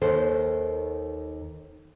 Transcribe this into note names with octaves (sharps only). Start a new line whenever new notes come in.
D#2 D#3 A4 C5